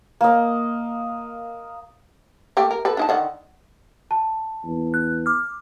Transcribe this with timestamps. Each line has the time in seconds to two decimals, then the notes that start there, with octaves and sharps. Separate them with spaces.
0.21 A#3 D#5
2.57 A3 A#3 G4
2.71 A#4
2.85 A4 B4
2.97 D4 D#4 A5
3.09 D3 D#3 F#5
4.11 A5
4.65 E2
4.94 F#6
5.26 D6 F6